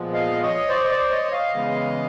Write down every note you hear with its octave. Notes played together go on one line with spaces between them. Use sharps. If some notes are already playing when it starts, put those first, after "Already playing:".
Already playing: A#2 F3 G#3 B3
D#5 F5
C#5 D#5
C5 D5
D#5
C5 D5
C#5 D#5
D#5 F5
C#3 E3 G#3 B3